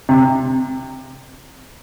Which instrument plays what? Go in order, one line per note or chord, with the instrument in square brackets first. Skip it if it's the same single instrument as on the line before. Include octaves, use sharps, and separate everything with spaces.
[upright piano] C3